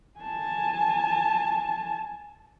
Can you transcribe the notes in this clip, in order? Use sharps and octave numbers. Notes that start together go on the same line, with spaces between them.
G#5 A5